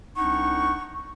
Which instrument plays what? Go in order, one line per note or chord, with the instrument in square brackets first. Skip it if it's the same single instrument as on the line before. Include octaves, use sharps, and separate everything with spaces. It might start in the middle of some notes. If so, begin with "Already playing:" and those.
[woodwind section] C2 C4 D4 D#4 F#5 C#6